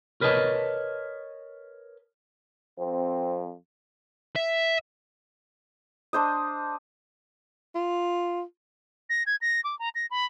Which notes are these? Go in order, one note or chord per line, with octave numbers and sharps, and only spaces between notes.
A#4 B4 C#5 D#5 G#5 A5
F2 C4
E5
D4 C5 D#5
F4
A#6
G#6
A#6
D6
A#5
A#6
B5